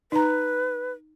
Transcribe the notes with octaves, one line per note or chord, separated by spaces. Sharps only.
D#4 B4 A#5